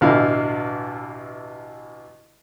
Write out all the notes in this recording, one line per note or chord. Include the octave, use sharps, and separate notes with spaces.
A1 E2 B2 D3 E4 F5